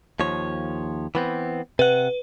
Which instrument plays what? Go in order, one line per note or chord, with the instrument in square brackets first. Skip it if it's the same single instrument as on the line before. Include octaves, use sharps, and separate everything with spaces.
[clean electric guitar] D#2 F3 C#5
E3 B3 C4
[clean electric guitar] C3 F#5 [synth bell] B4